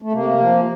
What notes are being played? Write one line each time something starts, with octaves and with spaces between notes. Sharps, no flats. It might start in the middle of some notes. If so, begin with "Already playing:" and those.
A3
C3 A#3
F3